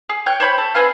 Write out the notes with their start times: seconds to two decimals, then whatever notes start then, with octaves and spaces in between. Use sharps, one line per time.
0.09 G#4
0.26 C#5 G5 F#6
0.40 C5 C#5 B5 G6
0.58 A4
0.74 C4 G#4 B4 F5